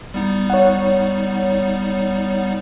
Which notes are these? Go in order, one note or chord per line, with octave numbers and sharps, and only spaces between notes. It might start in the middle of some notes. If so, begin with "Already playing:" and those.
G3 B3 D#4
C#5 F#5